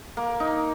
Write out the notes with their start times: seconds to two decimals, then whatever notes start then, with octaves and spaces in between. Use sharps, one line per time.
0.17 A#3
0.40 D#4